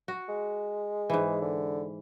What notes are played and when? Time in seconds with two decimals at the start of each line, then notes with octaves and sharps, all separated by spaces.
0.08 F#4
0.29 G#3
1.10 G#2 E3
1.41 D3